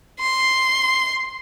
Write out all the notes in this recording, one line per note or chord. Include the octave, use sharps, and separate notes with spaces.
C6